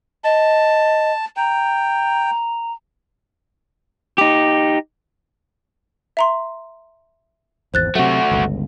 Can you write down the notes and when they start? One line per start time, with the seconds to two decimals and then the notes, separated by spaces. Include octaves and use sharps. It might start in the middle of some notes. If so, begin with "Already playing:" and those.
0.24 D#5 A5
1.37 G5 A#5
4.18 D#4 G4
6.17 E5 A#5 C6
7.74 G#1 E2 C5 F#6 A6
7.95 C3 F#3 A3 F#4 F#5
8.31 G1 C#2